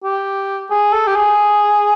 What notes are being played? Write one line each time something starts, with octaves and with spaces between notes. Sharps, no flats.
G4
G#4
A4
G4
G#4